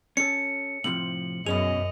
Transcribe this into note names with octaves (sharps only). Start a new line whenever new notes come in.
C#4 A4 C#7
A2 C3 F3 F#7
F#2 B2 C#4 G#4 D#5 F7